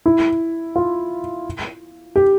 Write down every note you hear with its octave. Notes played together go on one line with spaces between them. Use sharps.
E4
F4
G4